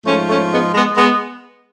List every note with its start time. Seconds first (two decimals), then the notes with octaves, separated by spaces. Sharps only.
0.05 G#2 F3 A3 C#4
0.28 A3 C#4
0.51 G#3 B3
0.74 G#3 B3
0.97 G#3 B3